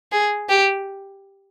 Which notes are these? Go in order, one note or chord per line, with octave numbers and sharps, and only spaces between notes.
G#4
G4